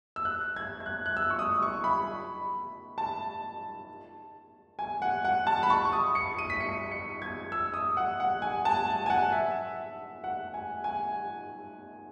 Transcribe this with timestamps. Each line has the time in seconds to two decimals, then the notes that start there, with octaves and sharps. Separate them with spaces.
0.16 E6
0.25 F#6
0.56 G#6
0.80 G#6
0.86 F#6
1.06 F#6
1.17 E6
1.30 C#6
1.39 D#6
1.62 C#6
1.84 B5
2.98 A5
4.79 G#5
5.02 F#5
5.25 F#5
5.47 A5
5.63 B5
5.70 C#6
5.85 C#6
5.93 D#6
6.15 C#7
6.39 D#7
6.50 B6
6.60 C#7
6.91 C#7
7.22 G#6
7.52 E6
7.74 D#6
7.97 F#5
8.20 F#5
8.42 G#5
8.65 A5
9.06 G#5
9.10 F#5
9.32 E5
10.24 F#5
10.54 G#5
10.84 G#5